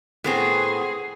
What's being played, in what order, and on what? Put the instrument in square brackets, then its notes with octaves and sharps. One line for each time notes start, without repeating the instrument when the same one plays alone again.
[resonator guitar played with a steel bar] A2 B3 C4 [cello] G#4